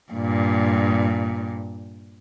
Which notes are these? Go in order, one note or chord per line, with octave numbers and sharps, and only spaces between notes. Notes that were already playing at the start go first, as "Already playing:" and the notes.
G2 A#2